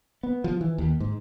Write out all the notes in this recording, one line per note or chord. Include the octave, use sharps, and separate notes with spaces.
B3
F3
E3
D#2
G#2